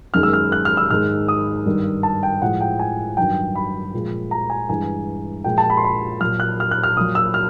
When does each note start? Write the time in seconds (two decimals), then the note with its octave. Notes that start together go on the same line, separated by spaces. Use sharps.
0.14 F#2 D#3 G#3 F6
0.23 E6
0.33 F6
0.52 F#6
0.65 F6
0.77 E6
0.90 G#2 D#3 G#3 F6
1.28 D#6
1.66 G2 D#3 G3
2.03 A5
2.23 G5
2.42 A2 F3 G#3 F#5
2.61 G5
2.79 G#5
3.17 G2 D#3 F#3 G5
3.55 B5
3.93 A#2 F3 G#3
4.31 A#5
4.50 G#5
4.69 G2 E3 G#3 G#5
5.44 A#2 F3 G#3 G5
5.58 A5
5.70 B5
5.77 C6
5.84 B5
6.21 A#2 F#3 F6
6.40 F#6
6.60 F6
6.71 F#6
6.83 F6
6.97 A#2 F#3 D#6
7.15 E6
7.34 F6